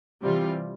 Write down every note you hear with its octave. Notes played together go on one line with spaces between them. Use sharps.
C3 E3 G3 C4 F4